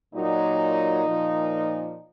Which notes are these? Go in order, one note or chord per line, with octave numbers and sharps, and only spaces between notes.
A#2 F#3 D#4
A#2 F3